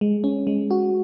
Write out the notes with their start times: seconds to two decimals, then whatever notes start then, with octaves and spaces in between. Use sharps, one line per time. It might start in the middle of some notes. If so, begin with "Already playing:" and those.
0.01 G#3
0.24 C#4
0.47 G#3
0.71 F#4